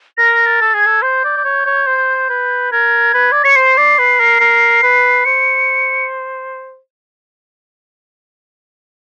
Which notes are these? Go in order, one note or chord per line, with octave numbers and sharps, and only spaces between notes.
A#4 A#6
A6
A4
G#4 G#6
A4
C5 G6
D5
D5
C#5
C#5
C5
B4
A#4 G#6
B4
D5
C#5 C#7
C5 C7
D5
B4
A#4
A#4
B4
C5 C#7